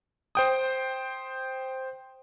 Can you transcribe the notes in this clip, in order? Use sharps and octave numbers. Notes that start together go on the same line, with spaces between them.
C5 G5 D#6